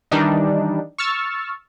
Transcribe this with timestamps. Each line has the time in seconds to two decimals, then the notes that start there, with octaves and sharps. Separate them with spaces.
0.12 D#3 E3 G3 D4 D#4
0.98 C#6 E6 F6 A6